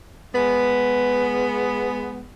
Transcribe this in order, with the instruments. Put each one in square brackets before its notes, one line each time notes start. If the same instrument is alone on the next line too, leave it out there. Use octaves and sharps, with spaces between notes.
[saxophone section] G#3 B3